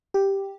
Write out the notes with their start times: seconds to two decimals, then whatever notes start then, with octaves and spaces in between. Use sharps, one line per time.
0.14 G4